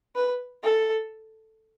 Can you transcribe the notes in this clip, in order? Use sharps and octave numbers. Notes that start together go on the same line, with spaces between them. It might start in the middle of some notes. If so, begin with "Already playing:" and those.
B4
A4